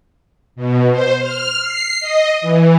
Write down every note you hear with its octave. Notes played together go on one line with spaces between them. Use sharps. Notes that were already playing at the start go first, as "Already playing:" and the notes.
B2
C5
F6
C7
D#5
E3